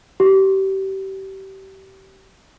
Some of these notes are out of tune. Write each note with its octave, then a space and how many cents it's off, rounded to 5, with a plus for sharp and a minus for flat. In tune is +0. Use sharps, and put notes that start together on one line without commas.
G4 -30